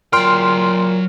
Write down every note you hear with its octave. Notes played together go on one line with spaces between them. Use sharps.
A#2 F#3 G5 C6 F6